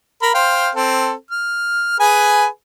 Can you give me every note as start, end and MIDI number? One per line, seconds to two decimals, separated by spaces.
0.22 0.30 70
0.22 0.30 83
0.35 0.70 72
0.35 0.70 77
0.35 0.70 79
0.75 1.12 60
0.75 1.12 69
1.31 1.98 89
2.00 2.46 68
2.00 2.46 71
2.00 2.46 80